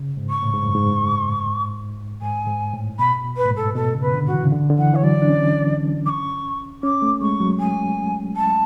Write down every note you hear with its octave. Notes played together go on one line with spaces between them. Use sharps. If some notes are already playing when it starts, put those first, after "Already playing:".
Already playing: C#3
G#2
C#6
A2
G#2
F#2
G#2
G#2 G#5
G#2
A2
B2 B5
B4
A2
G#2
A4
B2 A4
C#3
B4
D3
F#4
E3
C#3
D3
D3
E3 F#5
E3 C#5
F#3 D5
D4
C#4
D6
C#6
C#4 D6
A3
G#3 C#6
F#3
G#5
A5